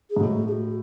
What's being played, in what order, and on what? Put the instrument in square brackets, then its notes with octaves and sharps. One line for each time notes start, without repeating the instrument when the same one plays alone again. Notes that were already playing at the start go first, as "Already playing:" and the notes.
[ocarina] G#4
[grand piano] G#2
[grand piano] A2 [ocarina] F#4
[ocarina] G#4
F#4